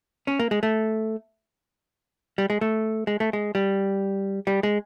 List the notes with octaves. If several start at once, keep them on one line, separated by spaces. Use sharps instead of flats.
C#4
A#3
G#3
A3
G3
G#3
A3
G#3
A3
G#3
G3
G3
G#3